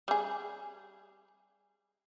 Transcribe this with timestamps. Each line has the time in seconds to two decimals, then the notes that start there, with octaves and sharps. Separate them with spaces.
0.08 G3 G#4